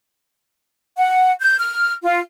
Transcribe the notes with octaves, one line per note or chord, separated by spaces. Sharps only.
F#5
G6
F6
F4